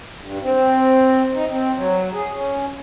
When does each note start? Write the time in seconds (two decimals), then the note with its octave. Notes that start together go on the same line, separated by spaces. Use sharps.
0.21 G2
0.43 C4
1.34 D#4
1.50 C4
1.75 F#3
2.13 G#4
2.33 C#4